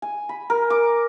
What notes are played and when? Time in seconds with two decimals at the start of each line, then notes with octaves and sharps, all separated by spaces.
0.02 G#5
0.29 B5
0.50 A#4
0.70 D6